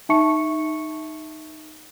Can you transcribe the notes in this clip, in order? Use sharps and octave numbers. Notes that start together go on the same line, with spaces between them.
D#4 E5 A5 C#6 C#7